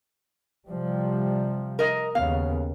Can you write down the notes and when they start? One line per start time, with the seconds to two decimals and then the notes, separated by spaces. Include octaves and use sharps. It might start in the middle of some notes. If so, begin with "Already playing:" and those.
0.68 C3 F3 G3
1.79 A#4 D#5
2.15 D#2 C#3 B3 F5